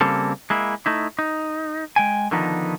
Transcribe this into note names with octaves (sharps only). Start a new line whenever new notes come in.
C#3 G3 A#3 C4 A4
G#3 A#3 E4
A3 D#4 E4
D#4
G#3 G5 G#5
D3 D#3 F3 B3 D#4